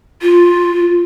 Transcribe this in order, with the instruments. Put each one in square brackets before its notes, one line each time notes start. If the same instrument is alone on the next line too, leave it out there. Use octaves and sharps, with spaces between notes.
[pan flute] F4